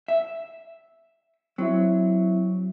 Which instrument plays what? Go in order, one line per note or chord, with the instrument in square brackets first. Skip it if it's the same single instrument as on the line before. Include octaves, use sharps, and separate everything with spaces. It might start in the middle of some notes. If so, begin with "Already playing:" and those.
[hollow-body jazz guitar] E5
[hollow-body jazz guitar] F#3 [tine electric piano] C4 E4 E5